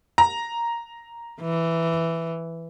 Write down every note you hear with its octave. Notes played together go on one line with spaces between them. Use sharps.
A#5
E3